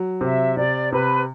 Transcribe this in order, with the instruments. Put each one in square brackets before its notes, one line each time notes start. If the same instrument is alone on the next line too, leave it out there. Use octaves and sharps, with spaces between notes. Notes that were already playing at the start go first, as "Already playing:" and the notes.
Already playing: [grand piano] F#3
[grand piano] C3 [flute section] E5
[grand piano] C3 [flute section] D5
[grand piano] C3 [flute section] B4